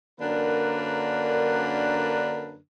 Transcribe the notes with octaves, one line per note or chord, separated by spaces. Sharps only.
F#2 D3 A#3 D4 A#4 B4